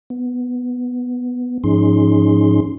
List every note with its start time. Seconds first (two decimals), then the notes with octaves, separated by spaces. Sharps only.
0.10 B3
1.64 G#2 F3 C#4 D#4 G#4 C6